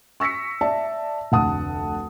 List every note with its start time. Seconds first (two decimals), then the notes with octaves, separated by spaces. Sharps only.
0.20 C#6 E6 A#6 B6 C#7
0.61 D5 E5 A5
1.32 F1 D2 F#5 A5 D#6